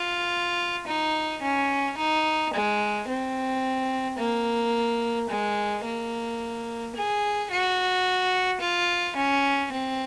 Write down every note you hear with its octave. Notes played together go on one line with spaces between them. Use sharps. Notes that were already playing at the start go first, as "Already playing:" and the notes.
Already playing: F4
D#4
C#4
D#4
G#3
C4
A#3
G#3
A#3
G#4
F#4
F4
C#4
C4